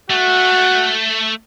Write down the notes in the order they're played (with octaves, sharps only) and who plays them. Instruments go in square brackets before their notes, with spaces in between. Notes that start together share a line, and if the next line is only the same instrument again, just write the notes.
[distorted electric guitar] A3 [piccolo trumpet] F#4